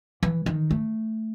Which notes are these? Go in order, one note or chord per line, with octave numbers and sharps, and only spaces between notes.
E3
D#3
A3